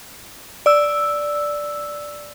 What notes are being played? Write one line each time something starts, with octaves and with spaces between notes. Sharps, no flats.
D5 E6